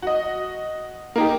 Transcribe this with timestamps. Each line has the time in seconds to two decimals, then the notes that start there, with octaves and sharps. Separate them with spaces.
0.02 F#4 D#5
1.16 A#3 D#4 G4